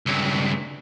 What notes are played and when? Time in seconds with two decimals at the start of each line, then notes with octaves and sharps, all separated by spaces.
0.06 C#2 G2